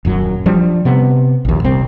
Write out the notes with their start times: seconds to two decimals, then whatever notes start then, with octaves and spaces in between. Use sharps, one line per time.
0.05 D#1 F#2 F#3
0.46 F3 G3 D4
0.85 C3 B3
1.45 A#1 D#2
1.64 D#1 C2 C4